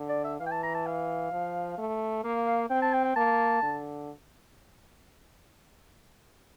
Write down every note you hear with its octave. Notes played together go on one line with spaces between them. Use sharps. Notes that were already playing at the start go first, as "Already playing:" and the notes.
Already playing: D3
D5
E5
E3 F5
G5
A5
A#5
A5
F5
F3
A3
A#3 F5
F5
C4 G5
A5
G5
G5
A#3 A5
D3